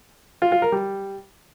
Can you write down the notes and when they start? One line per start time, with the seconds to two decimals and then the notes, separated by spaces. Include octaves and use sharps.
0.42 F4
0.52 F4
0.62 A#4
0.72 G3